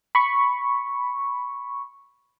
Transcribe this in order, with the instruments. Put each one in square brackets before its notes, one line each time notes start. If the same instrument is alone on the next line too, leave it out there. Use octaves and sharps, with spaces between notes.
[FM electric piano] B5 C#6